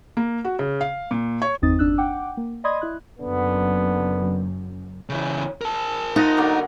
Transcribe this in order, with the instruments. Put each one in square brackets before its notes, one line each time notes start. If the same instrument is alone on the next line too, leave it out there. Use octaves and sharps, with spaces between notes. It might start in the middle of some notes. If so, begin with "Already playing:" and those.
[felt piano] A#3
F#4
C#3
F5
A#2
C#5
[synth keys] G1 E2 C4 D#4 D#6 A6
G1 D4 E6 F#6
F#5 G5 D6
A#3
D5 D#5 B5 C6 D#6 G#6
E4 F#6
[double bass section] F#1 F#2 [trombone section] D3 B3
[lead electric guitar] C#3 E3
A#4 A5
[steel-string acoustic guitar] D#4 [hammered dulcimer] F4 D#5 F#5
[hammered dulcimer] D3 F#3 A#3